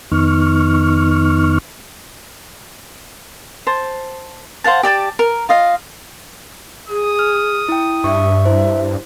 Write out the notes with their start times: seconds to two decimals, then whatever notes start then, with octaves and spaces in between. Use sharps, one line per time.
0.12 F2 D#3 B3 D#4 C#6 F6
3.67 C5 A5
4.64 C5 F5 F#5 A5
4.83 G4 D5 A5 D6
5.19 A#4
5.49 F4 D#5 F5
6.89 G#4 D#6
7.19 F6
7.69 E4 G5
8.04 G2 E5 C#6
8.45 E4 C5